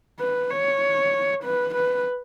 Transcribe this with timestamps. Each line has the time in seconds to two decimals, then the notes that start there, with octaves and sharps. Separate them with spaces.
0.20 B4
0.51 C#5
1.44 B4
1.75 B4